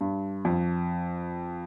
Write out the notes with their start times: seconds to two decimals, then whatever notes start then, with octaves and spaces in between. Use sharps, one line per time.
0.01 G2
0.45 F2